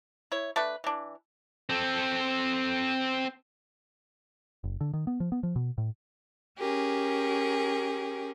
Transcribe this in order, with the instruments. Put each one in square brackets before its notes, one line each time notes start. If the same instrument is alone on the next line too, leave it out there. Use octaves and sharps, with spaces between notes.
[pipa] E4 C#5
A3 D4 B4
E3 D4
[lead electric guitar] C4 A4
[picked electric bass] F#1
D3
D#3
B3
F3
B3
F3
B2
A2
[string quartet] C#4 G4 G#4 A#4